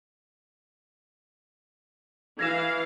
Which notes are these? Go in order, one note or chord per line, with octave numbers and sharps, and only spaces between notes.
E3 F5 G#6 A#6 E7